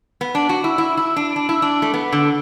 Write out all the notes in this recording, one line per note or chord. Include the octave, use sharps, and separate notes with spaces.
B3
D4
F#4
E4
E4
E4
D4
D4
E4
D4
A3
B3
D3